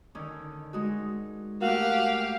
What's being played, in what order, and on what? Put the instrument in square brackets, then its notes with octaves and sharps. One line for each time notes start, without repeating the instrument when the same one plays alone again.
[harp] D3 D#3 C#4
G#3 D#4 F#4
[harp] A3 [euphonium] A#3 [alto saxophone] F#4 [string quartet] G4 F5